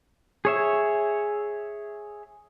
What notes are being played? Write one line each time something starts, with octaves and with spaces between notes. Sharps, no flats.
G#4 C#5 E5